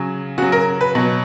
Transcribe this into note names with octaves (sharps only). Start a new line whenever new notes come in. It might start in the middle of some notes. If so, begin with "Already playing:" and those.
Already playing: C#3 F#3
C#3 F#3 F#4
A#4
B4
B2 F#3